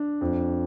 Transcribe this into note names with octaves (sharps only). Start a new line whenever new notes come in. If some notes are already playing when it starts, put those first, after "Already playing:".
Already playing: D4
F2